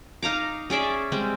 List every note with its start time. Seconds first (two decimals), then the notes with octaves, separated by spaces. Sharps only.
0.23 D#4 F5 A#5 D6
0.70 C#4 G#4 D5 E5
1.12 G3 G#3 C4